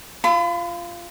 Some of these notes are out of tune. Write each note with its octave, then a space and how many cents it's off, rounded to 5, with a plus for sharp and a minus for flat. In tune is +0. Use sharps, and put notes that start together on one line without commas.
F4 -15 B5 +40